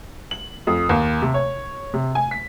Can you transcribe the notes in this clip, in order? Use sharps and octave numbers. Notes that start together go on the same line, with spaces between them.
F#7
F2
D#2
C3
C#5
C3
G#5
B6